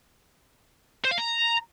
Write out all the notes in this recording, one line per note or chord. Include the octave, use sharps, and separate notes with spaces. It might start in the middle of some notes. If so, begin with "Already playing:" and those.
C5
F5
A#5